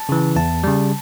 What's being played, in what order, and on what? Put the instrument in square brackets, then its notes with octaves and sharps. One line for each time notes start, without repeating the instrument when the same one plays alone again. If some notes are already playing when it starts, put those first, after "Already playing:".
Already playing: [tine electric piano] A5
C#3 E3
E2 A5
C#3 G3